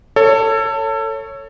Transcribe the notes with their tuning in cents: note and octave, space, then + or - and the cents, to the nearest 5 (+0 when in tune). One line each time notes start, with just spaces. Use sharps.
A4 +25 C#5 +0